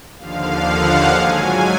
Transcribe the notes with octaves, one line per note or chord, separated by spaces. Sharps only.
D#2 D3 F3 F5
F#5
G#2 F#3 G#5